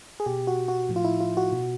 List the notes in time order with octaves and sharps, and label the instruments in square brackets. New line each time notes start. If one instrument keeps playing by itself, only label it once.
[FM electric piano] G#4
B2 G4
F#4
F#4
A2 F3
F4
E4
F4
F#4
B2